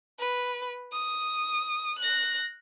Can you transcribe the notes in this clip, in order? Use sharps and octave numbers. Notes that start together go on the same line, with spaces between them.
B4
D#6
F#6 A#6